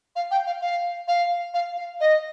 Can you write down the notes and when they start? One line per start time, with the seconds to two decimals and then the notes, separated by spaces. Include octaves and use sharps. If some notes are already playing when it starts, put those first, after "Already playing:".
0.16 F5
0.31 G5
0.47 F5
0.61 F5
1.08 F5
1.54 F5
1.77 F5
2.00 D#5